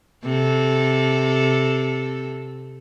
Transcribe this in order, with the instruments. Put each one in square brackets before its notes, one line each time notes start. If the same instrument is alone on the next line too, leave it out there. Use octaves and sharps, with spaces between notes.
[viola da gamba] C3 C4 A4